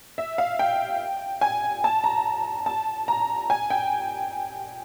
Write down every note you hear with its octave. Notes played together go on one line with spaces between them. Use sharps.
E5
F5
G5
G#5
A5
A#5
A5
A#5
G#5
G5